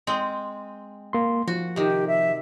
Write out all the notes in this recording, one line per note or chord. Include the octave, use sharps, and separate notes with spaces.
G#3 C4
A#3 C6
F3 F#4
C3 D#3 G4
E5